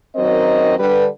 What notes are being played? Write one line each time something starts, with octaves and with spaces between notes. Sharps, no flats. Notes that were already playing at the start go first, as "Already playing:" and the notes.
F#2 D#3 F#3 C4 A#4 D#5
D3 G3 B4